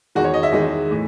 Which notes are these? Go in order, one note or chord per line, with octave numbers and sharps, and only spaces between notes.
E2 D#3 G#3 F#4
C#5
D#5
E5
E2 D#3 G#3
A2 E3